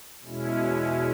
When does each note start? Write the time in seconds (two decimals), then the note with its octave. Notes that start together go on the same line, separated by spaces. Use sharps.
0.24 E2 B2 G#3 C#4 E4